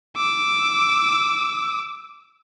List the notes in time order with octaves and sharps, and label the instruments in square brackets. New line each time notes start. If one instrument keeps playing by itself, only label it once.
[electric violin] D6 E6